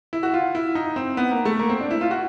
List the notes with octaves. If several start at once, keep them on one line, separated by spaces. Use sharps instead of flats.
E4
F#4
F4
E4
D#4
C4
B3
A#3
A3
A#3
C4
D4
E4
F4
F#4